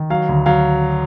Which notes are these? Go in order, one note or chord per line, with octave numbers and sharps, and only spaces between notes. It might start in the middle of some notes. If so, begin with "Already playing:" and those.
Already playing: D#3
F#3 F5
D2
F#3 F5